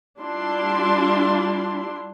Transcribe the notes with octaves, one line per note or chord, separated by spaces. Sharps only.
G3 D4 E4 F4 C6